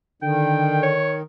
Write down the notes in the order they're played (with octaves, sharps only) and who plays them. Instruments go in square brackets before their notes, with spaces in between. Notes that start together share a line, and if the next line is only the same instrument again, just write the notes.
[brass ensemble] D3 [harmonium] D#3 [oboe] G5
[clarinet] C#5